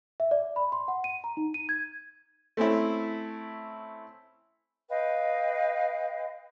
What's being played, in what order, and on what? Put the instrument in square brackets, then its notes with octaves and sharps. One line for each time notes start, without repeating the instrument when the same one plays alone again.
[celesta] E5
D5
B5
C6
F#5
D#7
A#5
D#4
D#7
G#6
[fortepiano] A3 C4 C#4 E4
[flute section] B4 D#5 F5 G5